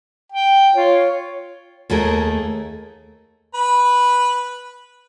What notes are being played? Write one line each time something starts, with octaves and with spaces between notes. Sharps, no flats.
G5
F4 C#5
D#2 A3 G#4 A#4
B4 B5